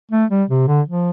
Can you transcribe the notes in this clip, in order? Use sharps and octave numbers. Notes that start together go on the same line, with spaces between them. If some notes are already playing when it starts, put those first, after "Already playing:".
A3
G3
C3
D3
F3